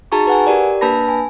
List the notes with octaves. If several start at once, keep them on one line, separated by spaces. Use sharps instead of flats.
D#4 F#4 G#4 A5 A#5 C#6
B4 F#5 G#5
G4 A#4 D5
A#3 D4 B4 A5 B5 A#6
G#5